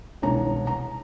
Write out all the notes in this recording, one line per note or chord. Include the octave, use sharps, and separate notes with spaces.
E1 C2 D#3 D4 C#5 A#5
A#5